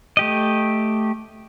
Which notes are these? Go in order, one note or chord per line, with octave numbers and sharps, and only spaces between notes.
A3 G4 D#5